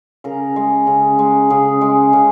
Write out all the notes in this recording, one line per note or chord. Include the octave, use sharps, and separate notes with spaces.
C#3 A#4
G#3
C#3
G#3
C#3 G#4
G#3
C#3